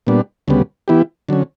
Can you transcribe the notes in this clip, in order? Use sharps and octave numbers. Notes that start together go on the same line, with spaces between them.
A#2 G3 B3 D4
D2 C#3 G3 B3
E3 B3 E4 G4
D3 F#3 C#4